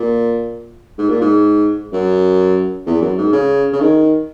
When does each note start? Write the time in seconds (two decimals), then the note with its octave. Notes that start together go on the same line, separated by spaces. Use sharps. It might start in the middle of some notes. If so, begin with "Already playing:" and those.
Already playing: A#2
0.98 G#2
1.10 A#2
1.21 G#2
1.92 F#2
2.86 E2
3.01 F#2
3.18 G#2
3.32 C#3
3.73 C#3
3.81 D#3